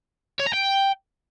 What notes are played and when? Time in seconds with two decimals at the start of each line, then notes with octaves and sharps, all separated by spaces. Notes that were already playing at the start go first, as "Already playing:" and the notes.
0.40 C#5
0.47 A#5
0.54 G5